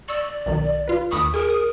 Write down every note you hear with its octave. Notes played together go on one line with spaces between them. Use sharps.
D5 C#6 E6
B1 D#3
F4 B4
D#2 B5 C#6 D#6
G#4 A#4
D#6